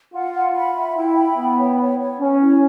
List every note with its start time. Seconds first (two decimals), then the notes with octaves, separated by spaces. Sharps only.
0.13 F4 F#5
0.35 F#5
0.55 B5
0.76 E5
0.97 E4 G5
1.17 B5
1.38 B3 G5
1.58 C#5
1.79 C#5
1.99 C#5
2.20 C#4 C#5
2.41 E4